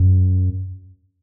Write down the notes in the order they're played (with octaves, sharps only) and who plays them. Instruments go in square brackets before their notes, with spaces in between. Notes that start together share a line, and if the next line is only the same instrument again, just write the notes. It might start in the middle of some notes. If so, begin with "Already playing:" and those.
Already playing: [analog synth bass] F#2